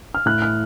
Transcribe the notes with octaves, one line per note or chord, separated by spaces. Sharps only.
F6
A2 F#6
F6